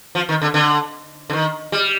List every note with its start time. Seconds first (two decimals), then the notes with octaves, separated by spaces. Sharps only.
0.15 F3
0.29 D#3
0.42 D3
0.54 D3
1.30 D3
1.33 D#3
1.72 G3